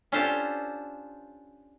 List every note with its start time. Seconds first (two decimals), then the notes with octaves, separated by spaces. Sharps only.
0.12 C#4 D4 F4 G4 A4 C5